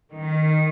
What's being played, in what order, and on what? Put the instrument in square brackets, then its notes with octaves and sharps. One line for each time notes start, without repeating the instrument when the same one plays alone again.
[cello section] D#3